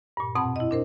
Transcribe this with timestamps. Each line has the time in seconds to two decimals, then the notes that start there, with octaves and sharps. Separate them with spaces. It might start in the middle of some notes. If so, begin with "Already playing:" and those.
0.17 G2 A#2
0.35 F2 B2 C4 F#5 A5 B5
0.56 E4 D#5
0.71 D4 A#4 C5